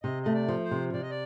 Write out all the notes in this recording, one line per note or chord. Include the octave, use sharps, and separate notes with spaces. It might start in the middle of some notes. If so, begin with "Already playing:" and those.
C3 D#5
A3 D#5
D5
F3
C5
C3
C3 D5
D#5
D5